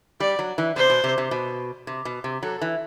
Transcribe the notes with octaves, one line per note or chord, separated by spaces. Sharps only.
G3 D5
F#3
E3
C3 C5
B2
C3
C3
B2
C3
B2
C3
F#3 A4
E3